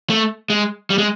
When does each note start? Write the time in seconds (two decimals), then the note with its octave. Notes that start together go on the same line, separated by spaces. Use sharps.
0.10 A3
0.50 G#3
0.90 G3
0.98 G#3